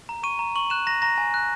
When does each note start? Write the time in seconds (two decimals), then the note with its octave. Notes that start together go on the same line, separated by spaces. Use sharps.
0.09 A#5
0.23 C#6 D#7
0.39 A#5
0.55 C#6 F#7
0.70 F#6 E7
0.86 A#5 A#6
1.02 A#5 A#6
1.18 G#5
1.34 F#6